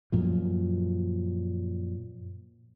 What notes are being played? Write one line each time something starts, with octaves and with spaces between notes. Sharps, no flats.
F#2 A#2 F3